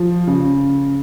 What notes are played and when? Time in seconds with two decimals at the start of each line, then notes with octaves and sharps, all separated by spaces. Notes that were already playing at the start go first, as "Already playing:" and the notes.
Already playing: F3
0.27 C#3